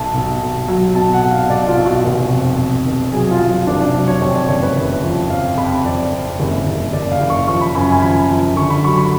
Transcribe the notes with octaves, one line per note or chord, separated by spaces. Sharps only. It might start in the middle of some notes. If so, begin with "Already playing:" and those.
Already playing: B1 A5
B1
B1
F#3
B2 A5
F#5
B1
F5
B1 D5
F4
B1
F#4
F1
F2
F2
F1
F#3 G#4
F4
F#3
F1 D4
D4
F#3
C#5
F2 C#5
D5
F#1 C#5
B4
F#1
F3
F2 F5
F2 B5
F2 D5
F2
F#1
F#1
F#1 D5
F5
F#1
C#6
F3 C#6
B5
F#2 B5
G#5
F3 B5
F3
D3 C#6
B5
F#3 C#6
B5